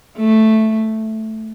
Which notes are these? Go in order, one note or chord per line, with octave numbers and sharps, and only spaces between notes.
A3